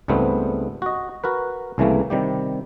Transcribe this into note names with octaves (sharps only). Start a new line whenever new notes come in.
C#2 G#2 G3 A3 B3 C4
F#4 D#5
F#4 A#4 B4
C2 C#3 E3 A3 A#3
C3 D#3 G3 G4